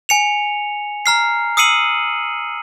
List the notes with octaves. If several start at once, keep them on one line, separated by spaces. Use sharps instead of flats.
G#5 C#7 F7
A#5 F6 C7
D#6 E6 C7 C#7 D#7 F#7